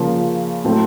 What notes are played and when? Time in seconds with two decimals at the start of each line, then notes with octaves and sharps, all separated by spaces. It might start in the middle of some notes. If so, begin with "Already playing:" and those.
Already playing: C#3 F3 A#3
0.64 A2 F#3 A3 C4